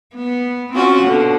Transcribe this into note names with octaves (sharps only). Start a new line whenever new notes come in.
B3
C4 C#4 F4 F#4
B2 D3